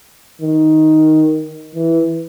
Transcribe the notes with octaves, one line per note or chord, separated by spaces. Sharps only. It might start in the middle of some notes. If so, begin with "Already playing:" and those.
D#3
E3